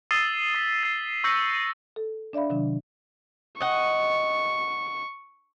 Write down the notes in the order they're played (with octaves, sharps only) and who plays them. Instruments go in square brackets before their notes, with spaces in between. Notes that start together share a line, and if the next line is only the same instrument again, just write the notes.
[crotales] D#6 E6 A6 C7 D#7 G7
D#6 B6
A6 C7
C#6 E6 G6 A#6 C#7
[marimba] A4
D4 D5 E5 F5 B5
C3 D#3 F#3 D4
[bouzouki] D#5 F#5 [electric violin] C#6